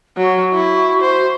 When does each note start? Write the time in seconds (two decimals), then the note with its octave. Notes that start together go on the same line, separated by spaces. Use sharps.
0.18 F#3 F#4
0.54 E4
1.02 C5